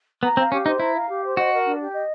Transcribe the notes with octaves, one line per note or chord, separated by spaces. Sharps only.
B3 A#5
C4 F5
C#4 G4
D#4 C5
E4 A#5
F5
G4
C5
F#4 D#5
A#4
D4
G4
D#5